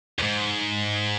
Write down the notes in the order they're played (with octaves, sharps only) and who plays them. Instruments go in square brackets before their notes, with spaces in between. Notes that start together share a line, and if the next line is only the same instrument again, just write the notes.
[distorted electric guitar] E2 G#2